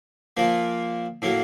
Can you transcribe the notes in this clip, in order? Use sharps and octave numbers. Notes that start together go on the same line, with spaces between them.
A#2 F3 A#3
A2 F#3 A#3